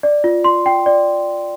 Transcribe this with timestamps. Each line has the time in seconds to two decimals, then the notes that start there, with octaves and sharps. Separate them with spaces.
0.03 D5
0.24 F4
0.44 C6
0.66 G5
0.86 D5